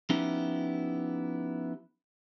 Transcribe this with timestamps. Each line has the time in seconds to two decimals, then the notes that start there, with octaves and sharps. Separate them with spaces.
0.10 F3 B3 C#4 D#4 E4 G4